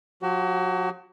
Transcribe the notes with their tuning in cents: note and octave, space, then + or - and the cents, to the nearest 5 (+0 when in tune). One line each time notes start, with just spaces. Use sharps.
F#3 -40 F#4 +40